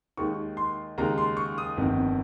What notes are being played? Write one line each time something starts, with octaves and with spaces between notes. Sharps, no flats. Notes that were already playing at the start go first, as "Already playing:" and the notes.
D#2 D#3 G#3 D#4 C#6
C6
D#2 C#3 G#3 D#4 A#5
C6
C#6
D#6
G1 F2 C3 D#3